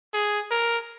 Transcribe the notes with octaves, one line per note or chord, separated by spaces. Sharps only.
G#4
A#4